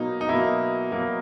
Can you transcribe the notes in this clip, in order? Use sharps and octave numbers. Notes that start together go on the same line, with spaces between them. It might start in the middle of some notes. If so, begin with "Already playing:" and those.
Already playing: B2 F#3 A#3 D#4
D#4
B2 F#3 A#3 E4
B2 F#3 A#3